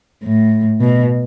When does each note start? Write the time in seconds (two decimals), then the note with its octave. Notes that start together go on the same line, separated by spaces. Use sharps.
0.24 A2
0.81 B2